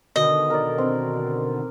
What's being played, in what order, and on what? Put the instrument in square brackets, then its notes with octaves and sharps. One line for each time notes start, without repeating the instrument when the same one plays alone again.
[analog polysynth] B2 D3 D#3 [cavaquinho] D#5
[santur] A#4 D5
C4